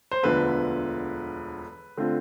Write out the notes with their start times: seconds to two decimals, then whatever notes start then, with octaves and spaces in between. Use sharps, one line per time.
0.11 C5
0.23 E1 D2 D3 F3 B3 B4
1.98 D3 A3 C4 F4